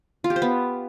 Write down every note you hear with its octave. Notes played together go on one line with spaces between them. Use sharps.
F4
G4
C5
B3